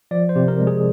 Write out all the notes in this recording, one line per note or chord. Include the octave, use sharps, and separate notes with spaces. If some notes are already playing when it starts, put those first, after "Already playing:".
F3 D5
C5
C3
A#4
G#3
G#4